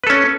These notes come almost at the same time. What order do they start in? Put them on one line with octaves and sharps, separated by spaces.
B4 A4 C#4